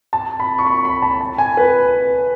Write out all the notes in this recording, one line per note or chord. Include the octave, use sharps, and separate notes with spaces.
A5
B5
C#6
B5
B5
A5
A5
G#5
B4